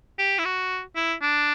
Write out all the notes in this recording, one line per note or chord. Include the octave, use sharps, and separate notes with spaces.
G4
E4
F#4
E4
D4